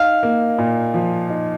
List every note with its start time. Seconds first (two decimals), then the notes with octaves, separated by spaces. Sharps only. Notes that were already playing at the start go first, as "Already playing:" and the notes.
Already playing: D#4 F5
0.23 A#3
0.58 A#2
0.94 F3
1.30 D#4